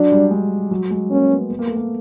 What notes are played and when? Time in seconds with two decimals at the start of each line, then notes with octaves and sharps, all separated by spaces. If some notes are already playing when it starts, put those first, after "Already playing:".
Already playing: F#3 D4
0.12 G3
0.31 G#3
0.71 F#3
0.90 G#3
1.10 A#3 C#4
1.31 B3
1.50 B3
1.59 A#3
1.67 A3
1.76 A#3